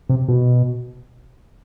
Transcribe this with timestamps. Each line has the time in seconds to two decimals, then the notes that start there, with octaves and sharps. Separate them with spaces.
0.09 C3
0.28 B2